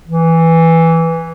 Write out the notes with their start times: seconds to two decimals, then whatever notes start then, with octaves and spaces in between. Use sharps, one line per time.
0.08 E3